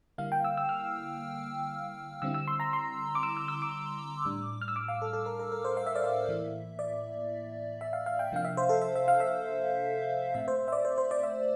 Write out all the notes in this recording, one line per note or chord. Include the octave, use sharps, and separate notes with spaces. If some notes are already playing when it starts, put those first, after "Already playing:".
D3 G3 A#3 E4 F5
G5
E6
E6
F6
D3 G3 C4 E4 E6
E6
C6
A#5
C6
D6
E6
E6
E6
D6
A2 G3 D4
F6
E6
D6
F5
A4
A4
A#4
A#4
A#4
C5
F5
E5
D5
E5
A2 E3 A#3 E4
D5
E5
F5
F5
G5
C3 F3 A#3 D4 F5
E5
C5
A4
E5
E5
F5
E5
A#2 A3 C4 E5
C5
E5
D5
C5
C5
D5
E5